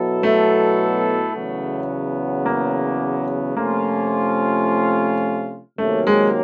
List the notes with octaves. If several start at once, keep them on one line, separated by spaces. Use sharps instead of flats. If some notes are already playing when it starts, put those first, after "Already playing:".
Already playing: B2 F#3 B3 E4 A4
A3
E2 C#3 F#3 B3
A#3
C3 F3 A3 A#3 C#4 F4
C3 D#3 F#3 A3 A#3 C#4
G#3